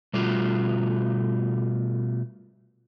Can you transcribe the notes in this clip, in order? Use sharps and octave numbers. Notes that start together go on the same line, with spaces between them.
B2 G3 A3 F4 F#4